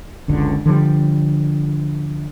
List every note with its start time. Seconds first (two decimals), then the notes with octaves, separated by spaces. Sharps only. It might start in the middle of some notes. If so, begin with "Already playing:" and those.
0.28 F#1 C#2 D3
0.66 D3 F3 G3